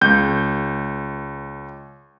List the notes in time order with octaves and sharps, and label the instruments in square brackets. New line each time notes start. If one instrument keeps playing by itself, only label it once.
[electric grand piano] C#2 G6